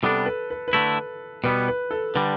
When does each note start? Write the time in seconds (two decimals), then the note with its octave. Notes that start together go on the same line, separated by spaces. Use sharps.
0.03 C3 G3 B3 D4 A4
0.26 B4
0.50 B4
0.68 B4
0.73 D3 A3 E4
1.44 B2 G3 B3 B4
1.68 B4
1.91 A4
2.14 D3 G3 B4